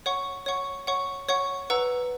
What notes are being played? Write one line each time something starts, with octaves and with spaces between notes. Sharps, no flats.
C#5 F#5 C#6
C#5 F#5 C#6
C#5 F#5 C#6
C#5 F#5 C#6
B4 F#5 A#5 E6